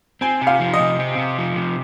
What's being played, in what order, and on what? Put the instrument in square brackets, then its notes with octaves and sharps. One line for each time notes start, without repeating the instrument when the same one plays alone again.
[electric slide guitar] C4 [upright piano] G#5
[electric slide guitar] C3
[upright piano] F5
[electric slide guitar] F3
[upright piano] D#5
[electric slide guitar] C3
C4
C3
F3
C3